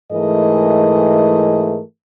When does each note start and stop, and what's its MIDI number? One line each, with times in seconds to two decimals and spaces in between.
0.12 1.81 44
0.12 1.81 52
0.12 1.81 57
0.12 1.81 68
0.12 1.81 70
0.12 1.81 75